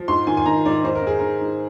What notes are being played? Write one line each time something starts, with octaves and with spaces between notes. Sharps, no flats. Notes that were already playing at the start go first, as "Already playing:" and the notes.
Already playing: F3
G#2 C6
D#3 G#5
G#5
D#3 A#5
G#2 D5
G#2 C5
A#4
D#3 G#4
D#3 A#4
G#2